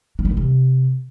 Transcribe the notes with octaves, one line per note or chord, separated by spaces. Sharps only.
F#3
G3
B2
C3